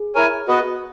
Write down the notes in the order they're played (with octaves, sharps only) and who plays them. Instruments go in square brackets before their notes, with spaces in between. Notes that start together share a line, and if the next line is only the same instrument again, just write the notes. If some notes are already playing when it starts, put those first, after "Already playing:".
Already playing: [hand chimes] G#4
[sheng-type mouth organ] E4 A#4 C#5 G#5
B3 F#4 B4 D#5